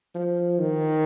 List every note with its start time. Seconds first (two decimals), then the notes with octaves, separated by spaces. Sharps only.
0.15 F3
0.60 D#3